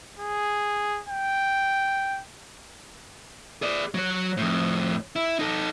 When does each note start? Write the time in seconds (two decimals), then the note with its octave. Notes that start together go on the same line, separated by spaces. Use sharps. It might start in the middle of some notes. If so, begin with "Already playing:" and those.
0.19 G#4
1.09 G5
3.62 G#4 D5
3.94 F#3 C#5
4.37 F2 A2
5.16 E4
5.39 D#4 A4